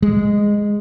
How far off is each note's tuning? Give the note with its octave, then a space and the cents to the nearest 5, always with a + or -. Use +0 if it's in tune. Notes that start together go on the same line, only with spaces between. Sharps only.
G#3 -10